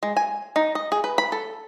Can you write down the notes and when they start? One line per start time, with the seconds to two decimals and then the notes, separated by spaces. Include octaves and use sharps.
0.03 G#3
0.17 G#5
0.56 D#4
0.75 D#5
0.92 G#4
1.04 B4
1.18 B5
1.32 A4